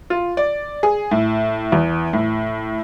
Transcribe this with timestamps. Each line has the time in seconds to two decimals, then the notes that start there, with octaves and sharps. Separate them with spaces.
0.10 F4
0.37 D5
0.83 G#4
1.11 A2
1.72 E2
2.13 A2